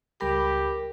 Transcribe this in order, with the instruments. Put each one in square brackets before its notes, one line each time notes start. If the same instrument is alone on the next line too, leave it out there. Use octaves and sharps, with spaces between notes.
[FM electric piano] C#2 G3 B5 [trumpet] G4 [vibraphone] A#4